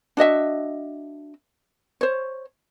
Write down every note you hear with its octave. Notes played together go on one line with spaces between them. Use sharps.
D4 F#4 D#5 E5
C5 C#5